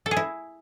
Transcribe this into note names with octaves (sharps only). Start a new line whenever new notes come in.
A4
G#4
E4